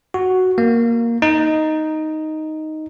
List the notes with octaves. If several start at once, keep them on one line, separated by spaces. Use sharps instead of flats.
F#4
A#3
D#4